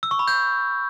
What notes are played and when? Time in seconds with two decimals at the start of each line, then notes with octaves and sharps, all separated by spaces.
0.03 E6
0.11 C#6
0.19 B5
0.28 G6